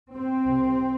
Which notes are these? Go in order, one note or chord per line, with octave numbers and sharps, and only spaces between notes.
C4
C2 C3